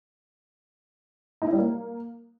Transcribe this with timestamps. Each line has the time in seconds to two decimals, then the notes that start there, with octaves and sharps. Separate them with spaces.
1.42 D#4
1.47 E4
1.53 G3
1.58 A#3